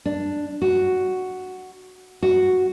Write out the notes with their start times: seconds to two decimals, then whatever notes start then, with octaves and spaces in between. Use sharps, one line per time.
0.06 D4
0.62 F#4
2.22 F#4